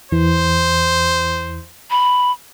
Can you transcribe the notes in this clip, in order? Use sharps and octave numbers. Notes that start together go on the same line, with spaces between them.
E2 E3 C5
B5